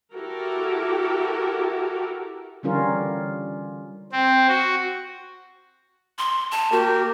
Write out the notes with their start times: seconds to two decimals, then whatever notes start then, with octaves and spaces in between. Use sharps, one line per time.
0.14 E4 F#4 G4 A4 A#4
2.63 D3 E3 G3 C#4 F4 A#4
4.12 C4
4.48 F#4
6.18 C6
6.52 A5
6.72 A#3 F#4 G4 A#4